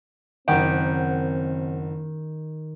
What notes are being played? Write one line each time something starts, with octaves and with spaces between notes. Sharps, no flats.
F#1 D#3 C4 G4 F#5